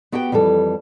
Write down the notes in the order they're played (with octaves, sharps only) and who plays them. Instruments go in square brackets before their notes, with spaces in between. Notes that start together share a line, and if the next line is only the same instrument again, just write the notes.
[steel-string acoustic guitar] B3 F#4 G4 F#5 G5
F2 E3 G3 A4